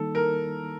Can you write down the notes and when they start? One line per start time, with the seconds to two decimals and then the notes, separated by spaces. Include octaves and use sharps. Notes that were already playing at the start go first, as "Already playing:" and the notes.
Already playing: D#3 G3 A#3 D#4 A4
0.15 A#4